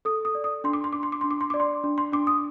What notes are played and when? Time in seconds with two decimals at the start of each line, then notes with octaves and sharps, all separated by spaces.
0.05 A4 D#6
0.25 D#6
0.35 D5
0.44 D#6
0.64 D4 C6
0.73 D6
0.84 C6
0.93 D4 D6
1.03 C6
1.12 D6
1.21 D4 C6
1.31 D6
1.41 C6
1.50 D5 D6
1.60 C6
1.84 D4
1.98 C6
2.12 D4 D6
2.27 D#6